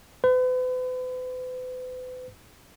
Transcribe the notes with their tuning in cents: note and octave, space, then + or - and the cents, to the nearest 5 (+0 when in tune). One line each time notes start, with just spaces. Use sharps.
B4 +45